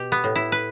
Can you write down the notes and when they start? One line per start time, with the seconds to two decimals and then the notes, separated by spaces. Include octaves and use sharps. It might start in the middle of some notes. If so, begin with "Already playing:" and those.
Already playing: B2 G4
0.12 B3
0.24 A2
0.36 E4
0.52 B4